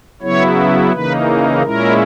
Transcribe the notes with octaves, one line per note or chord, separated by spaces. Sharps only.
C#3 F#3 B3 E4 C#5
C#3 E3 A#3 D#4 B4
A#2 G#3 C#4 E4 A#4